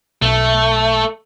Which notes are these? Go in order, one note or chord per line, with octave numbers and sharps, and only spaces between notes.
B1 A3